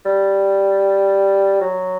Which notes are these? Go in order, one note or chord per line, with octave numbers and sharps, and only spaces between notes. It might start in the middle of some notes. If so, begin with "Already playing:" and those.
G3
F#3